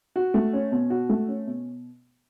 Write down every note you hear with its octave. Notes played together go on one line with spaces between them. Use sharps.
F#4
A3
C#4
B2
F#4
A3
C#4
B2